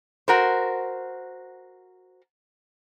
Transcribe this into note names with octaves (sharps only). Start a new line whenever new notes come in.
F#4 A#4 C5